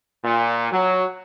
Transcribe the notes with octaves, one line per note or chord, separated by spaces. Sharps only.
A#2
F#3